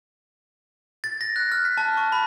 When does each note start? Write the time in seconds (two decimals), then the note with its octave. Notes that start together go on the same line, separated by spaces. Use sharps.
1.04 A6
1.21 A#6
1.36 F#6
1.52 F6
1.65 B6
1.77 A5
1.97 C#6
2.12 B5